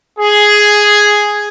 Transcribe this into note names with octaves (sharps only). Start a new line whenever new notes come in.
G#4